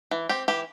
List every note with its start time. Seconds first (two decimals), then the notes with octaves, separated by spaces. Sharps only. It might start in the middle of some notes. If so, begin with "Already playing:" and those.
0.11 E3
0.29 C4 G4
0.48 E3 G4